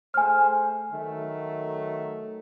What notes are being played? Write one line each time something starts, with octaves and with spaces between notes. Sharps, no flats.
A3 G#4 C5 G#5 F6
D#3 F#3 A3